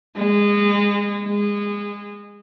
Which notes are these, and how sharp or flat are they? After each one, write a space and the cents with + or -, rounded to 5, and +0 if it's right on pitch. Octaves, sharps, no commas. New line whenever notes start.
G#3 -25
G#3 -25